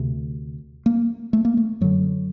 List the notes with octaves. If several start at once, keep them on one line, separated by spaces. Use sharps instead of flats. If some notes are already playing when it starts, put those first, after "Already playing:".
Already playing: D2 C3
A#3
A3
A#3
A3
F#2 D3 F#3